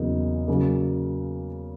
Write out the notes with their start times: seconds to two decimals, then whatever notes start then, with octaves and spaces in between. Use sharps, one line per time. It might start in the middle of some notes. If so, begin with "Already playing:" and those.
Already playing: E2 C#3 F#3 A#3 D#4
0.48 C#3 F#3 A#3